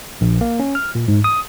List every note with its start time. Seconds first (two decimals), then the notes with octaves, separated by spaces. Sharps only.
0.21 A#1
0.41 A#3
0.60 C#4
0.75 F6
0.95 A#2
1.08 G#2
1.24 D#6